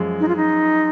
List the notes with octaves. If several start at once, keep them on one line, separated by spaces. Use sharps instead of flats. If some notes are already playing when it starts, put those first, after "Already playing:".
Already playing: F#2 F3 G#3
D#4
F4
D#4